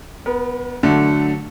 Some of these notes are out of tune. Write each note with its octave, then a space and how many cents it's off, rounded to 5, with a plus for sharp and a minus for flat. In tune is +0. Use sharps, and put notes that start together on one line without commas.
B3 +0 A#4 +45
D3 +0 F#3 -5 A3 -10